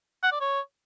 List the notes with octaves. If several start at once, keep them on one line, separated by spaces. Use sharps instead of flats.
F#5
D5
C#5